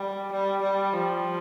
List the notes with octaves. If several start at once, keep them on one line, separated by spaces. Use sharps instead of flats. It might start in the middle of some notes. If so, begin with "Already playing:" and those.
Already playing: G3
G3
G3
F3